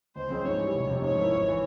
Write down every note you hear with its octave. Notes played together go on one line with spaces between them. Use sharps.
C#2 C5
C#3 F3 G#3 C4
G#2 C#5
E3 G3
F1
F2 C3 F3 C4
G#2 C#5
F3 A#3 E4
G#1
E3